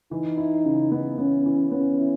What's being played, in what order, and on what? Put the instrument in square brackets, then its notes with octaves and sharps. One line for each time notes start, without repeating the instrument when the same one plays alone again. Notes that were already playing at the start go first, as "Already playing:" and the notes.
[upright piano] E3 [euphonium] D#4
[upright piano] E4
C#3
B3
[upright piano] B3 [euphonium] C#4
[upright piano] E3
[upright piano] B3 [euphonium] C#4
[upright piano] E4